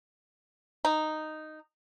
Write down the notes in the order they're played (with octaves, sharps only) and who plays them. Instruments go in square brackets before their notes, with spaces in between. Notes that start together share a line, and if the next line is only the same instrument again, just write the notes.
[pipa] D#4